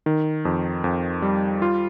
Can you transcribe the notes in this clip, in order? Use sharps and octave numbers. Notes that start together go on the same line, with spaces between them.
D#3
F2
F2
G3
F4